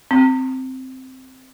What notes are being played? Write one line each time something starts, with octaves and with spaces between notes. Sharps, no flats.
C4